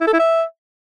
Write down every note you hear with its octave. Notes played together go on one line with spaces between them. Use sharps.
E4
A4
E4
E5